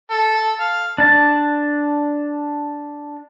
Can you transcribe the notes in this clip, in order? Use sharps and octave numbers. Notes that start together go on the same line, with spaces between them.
A4
F5
D4 A5